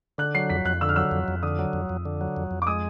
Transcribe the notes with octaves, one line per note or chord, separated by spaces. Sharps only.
D3 F#6
F#3 C7
F2 B6
F2 F#6
D3 E6
F6
F#3 E6
F2
F2
D3 D#6
F#3
F2
F2
D3
F#3
F2
F2
D6
G#3 D#6